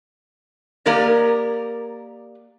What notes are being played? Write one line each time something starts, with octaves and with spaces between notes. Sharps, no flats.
A#3 G4 A#4 D5 D#5